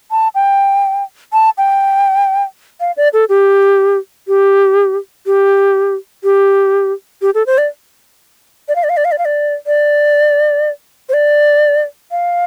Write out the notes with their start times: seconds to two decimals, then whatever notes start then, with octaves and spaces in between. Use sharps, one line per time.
0.11 A5
0.35 G5
1.33 A5
1.58 G5
2.80 F5
2.97 D5
3.13 A4
3.29 G4
4.28 G4
5.26 G4
6.24 G4
7.22 G4
7.35 A4
7.46 C5
7.58 D5
8.68 D5
8.76 F5
8.84 D5
8.89 F5
8.97 D5
9.05 F5
9.12 D5
9.18 F5
9.25 D5
9.67 D5
11.09 C5
11.13 D5
12.11 F5